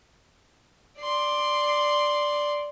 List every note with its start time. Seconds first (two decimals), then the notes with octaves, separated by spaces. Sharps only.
1.00 D5 C6